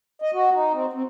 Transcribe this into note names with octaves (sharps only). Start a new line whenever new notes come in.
D#5
F#4
D#4
C4
C4